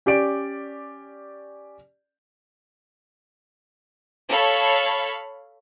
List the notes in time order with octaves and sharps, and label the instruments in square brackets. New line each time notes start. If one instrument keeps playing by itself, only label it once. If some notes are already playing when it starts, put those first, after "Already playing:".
[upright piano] C#4 G4 D5 D7
[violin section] A4 C#5 F5 B5